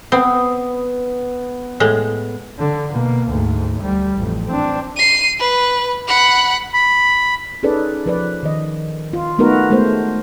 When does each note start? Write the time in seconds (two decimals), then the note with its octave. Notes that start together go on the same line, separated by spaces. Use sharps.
0.12 B3 C4
1.80 A2 G#3
2.59 D3
2.92 B2 A#3
3.29 D2 G#2
3.80 D2 G3
4.17 A1 F2
4.47 C4 D4
4.96 C7 D#7
5.40 B4
6.08 F#5 B5
6.74 B5
7.63 C#4 D#4 G#4 A4 B4 D5
8.06 F3 B4 D5
8.43 D#3 D#5
9.13 F4
9.38 A3 B3 D#4 F#4 A#4 B4
9.70 G#3 A3 B3 A#4 C5